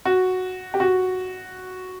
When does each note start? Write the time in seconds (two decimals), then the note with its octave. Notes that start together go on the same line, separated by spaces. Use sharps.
0.05 F#4
0.74 G4
0.80 F#4